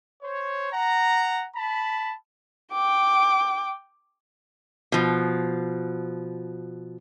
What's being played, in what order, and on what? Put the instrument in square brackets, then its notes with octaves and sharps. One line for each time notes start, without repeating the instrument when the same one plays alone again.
[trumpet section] C5 C#5
F#5 A#5
A5 B5
[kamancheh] G5 D6
[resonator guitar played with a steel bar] B2 F3